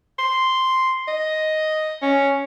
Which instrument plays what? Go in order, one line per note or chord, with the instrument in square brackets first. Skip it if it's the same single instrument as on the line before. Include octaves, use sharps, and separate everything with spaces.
[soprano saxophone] C6
D#5
C#4